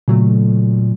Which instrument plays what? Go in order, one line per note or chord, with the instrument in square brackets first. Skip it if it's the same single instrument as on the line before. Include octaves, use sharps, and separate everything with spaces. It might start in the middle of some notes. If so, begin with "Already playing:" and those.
[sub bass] A#2 [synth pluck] C#3 F#3 A3